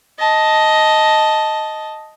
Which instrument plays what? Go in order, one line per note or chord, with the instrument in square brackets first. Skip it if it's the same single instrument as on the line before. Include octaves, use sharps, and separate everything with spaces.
[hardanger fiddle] D#5 A5